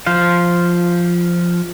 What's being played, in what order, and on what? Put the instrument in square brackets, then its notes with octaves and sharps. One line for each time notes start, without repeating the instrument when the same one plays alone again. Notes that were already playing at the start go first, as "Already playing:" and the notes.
[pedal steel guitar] F3 C5 F5